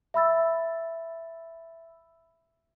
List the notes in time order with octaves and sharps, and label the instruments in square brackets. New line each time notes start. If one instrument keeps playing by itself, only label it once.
[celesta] E5 B5 E6 A6